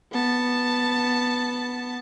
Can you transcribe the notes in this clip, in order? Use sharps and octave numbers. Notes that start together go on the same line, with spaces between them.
B3 A5